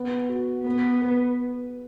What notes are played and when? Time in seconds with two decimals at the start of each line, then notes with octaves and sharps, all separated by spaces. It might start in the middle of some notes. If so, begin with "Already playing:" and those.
Already playing: B3 B4
0.29 F#4
0.66 B3 B4
1.02 B4